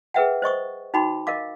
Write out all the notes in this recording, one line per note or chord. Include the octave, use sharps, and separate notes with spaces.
G#4 A#4 B4 E5 F#5 G5
C5 D#5 C#6 D#6
D#4 F#4 G5 B5 D6
A#4 D#5 F5 D6